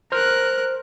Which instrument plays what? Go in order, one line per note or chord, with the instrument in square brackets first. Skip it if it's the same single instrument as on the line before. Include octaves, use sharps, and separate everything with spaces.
[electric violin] A#4 F#6 [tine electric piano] C5 F6